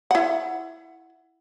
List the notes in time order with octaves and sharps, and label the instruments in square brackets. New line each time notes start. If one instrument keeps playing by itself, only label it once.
[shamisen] E4 F#5